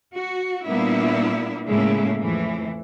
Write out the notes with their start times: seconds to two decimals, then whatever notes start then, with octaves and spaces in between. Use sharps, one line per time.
0.14 F#4
0.65 A#2 G3 A#3 B3 D4 E4
1.67 A2 C#3 G#3 A#3 E4
2.19 F2 A2 E3